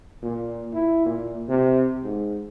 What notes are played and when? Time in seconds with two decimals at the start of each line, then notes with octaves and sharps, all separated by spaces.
0.23 A#2
0.73 E4
1.06 A#2
1.49 C3
2.04 G#2